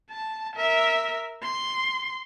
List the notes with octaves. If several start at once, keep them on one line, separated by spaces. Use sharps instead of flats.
A5
A#4 E5
C6